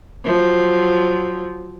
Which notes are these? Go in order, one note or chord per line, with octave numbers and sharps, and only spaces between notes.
F3 F#3